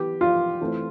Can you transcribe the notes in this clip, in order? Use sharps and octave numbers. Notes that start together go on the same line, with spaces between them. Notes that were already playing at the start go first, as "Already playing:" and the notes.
Already playing: E3 B3 G4
F4
E3 A3 C4